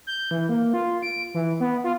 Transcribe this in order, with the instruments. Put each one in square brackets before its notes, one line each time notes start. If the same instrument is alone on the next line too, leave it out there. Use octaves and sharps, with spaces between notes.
[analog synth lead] G6
E3
A#3
F4
D7
E3
B3
F4